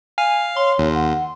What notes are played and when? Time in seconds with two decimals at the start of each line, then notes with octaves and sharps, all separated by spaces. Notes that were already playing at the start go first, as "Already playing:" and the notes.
0.18 F5 G#5
0.57 C#5 C6
0.78 D#2
0.94 F#5